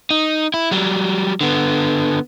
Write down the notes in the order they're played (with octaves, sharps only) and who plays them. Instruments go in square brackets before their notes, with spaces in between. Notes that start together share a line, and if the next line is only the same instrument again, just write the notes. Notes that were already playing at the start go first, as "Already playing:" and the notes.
[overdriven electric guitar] D#4
E4
F#3 G3
D3 B3